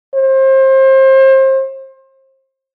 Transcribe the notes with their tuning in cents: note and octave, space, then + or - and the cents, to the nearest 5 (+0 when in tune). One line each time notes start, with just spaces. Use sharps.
C5 +30